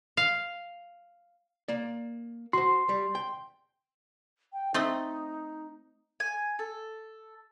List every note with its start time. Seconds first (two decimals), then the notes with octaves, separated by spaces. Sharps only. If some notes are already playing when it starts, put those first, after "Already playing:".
0.17 F5
1.68 A#3 D5
2.53 F#4 C5 C6
2.89 G3
3.15 G5
4.53 G5
4.74 A3 C4 D#4 D#5
6.20 G#5
6.59 A4